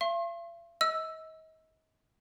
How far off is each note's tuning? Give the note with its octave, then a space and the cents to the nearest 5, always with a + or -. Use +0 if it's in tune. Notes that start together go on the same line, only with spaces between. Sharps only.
F5 -45 C6 +40
D#5 +40 E6 +0